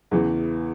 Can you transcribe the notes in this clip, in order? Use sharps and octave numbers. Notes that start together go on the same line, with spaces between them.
E2 C#3 E3